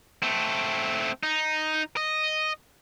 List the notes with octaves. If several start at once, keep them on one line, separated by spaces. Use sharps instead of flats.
A3 C4
D#4
D#5